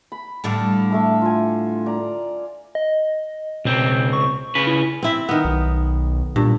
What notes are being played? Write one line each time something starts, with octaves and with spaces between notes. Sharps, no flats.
B5
A2 D3 G3 A4 F5 D6
A3 E5 A5
F4 G#5
D5 A#5
D#5
C#2 B2 C4
C#6
C#3 B4
E4
C4 E4 E5
D#3 B3
B1
G2 A#2